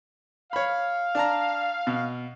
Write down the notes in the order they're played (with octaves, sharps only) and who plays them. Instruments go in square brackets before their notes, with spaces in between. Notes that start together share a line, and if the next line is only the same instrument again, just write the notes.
[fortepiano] C#5 B5 [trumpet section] F5
[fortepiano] D4 A5 A#5
B2